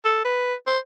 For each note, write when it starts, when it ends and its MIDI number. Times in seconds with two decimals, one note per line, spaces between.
0.05 0.22 69
0.25 0.54 71
0.67 0.78 72